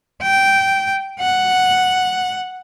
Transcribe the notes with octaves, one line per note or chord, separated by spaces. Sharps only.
G5
F#5